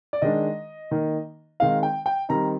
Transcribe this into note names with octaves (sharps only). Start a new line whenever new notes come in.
D5
D#3 G#3 D4 D#5
D#3 A#3 D#4
D#3 G#3 C4 D#4 F5
G5
G5
D#3 G3 C4 D#4 A#5